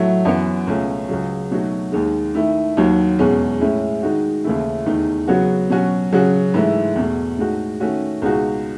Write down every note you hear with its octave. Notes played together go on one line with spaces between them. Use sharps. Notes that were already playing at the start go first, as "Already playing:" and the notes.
Already playing: A2 F#3 A3 E4
F#2 E3 B3
C#2 B2 A3 C#4
C#2 C#3 F#3
B2 F#3 A3 D#4 F#4
D#2 D#3 G#3
D#3 A3 E4
D#2 D#3 F#3
E2 B2 G#3 C#4
A2 G#3 C#4 E4
D#3 G#3 D#4 F#4
D#2 C#3 E3 A3 E4
E2 D#3 A3 D#4
C#3 F#3 B3 F#4
B2 F#3 C#4 F#4
C#3 F#3 C#4 F#4
G#2 E3 A3 E4
E2 B2 A3
A2 G#3 D#4 F#4
D#3 A3 C#4 F#4
C#2 B2 G#3 D#4 F#4